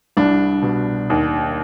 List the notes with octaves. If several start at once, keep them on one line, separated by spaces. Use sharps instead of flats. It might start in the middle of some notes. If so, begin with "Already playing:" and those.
C2 D4
B2
D#2